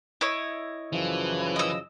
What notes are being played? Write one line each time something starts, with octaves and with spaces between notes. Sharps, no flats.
E4 C#5 D#5
F#2 C#3 E3 F3
D#5 E6